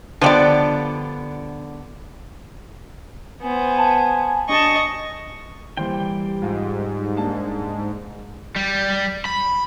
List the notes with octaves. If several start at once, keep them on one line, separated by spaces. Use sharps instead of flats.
D3 F3 G3 B3 D5
B3 C5 G#5
A5
D4 G4 D#5 A5 C#6
E3 G3 A#3 C5 G5
G#2 F4
A#3 D4 A5
G3
B5